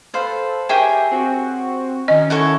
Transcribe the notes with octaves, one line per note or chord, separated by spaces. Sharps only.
A4 B4 C5 F5
G4 G#4 A#4 C#5 E5 G5
C4 F#4
D#3 C#4 D#5
E4 F#4 A4 C#5 C#6